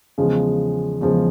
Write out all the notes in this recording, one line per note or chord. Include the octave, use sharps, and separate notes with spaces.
E2 C#3 F3 G#3
E2 C#3 F3 G#3